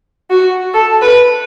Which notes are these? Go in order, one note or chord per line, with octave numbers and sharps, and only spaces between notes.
F#4
A4
B4